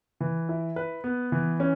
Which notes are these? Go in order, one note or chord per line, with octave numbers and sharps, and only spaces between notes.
E3
E4
B4
B3
E3
C#4